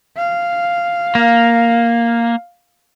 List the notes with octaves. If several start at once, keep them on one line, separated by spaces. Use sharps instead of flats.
F5
A#3